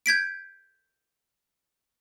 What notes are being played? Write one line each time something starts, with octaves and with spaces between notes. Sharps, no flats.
G6 G#6 B6 D7